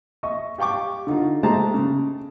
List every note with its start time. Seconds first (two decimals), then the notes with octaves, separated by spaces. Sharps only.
0.23 D#5 E5 C#6
0.58 G4 F5 G5 C#6 D6
1.07 D3 D#4 F4
1.43 G#3 A3 G4 C5 A5 A#5
1.74 C#3